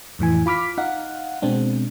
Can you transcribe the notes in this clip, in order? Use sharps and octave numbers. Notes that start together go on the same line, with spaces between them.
F2 A2 E3 G#5
F4 B5 D6 F6 B6
D#4 F5 F#5
B2 G#3 C4 D4